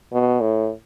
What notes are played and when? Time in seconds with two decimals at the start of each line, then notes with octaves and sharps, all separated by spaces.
0.13 B2
0.41 A2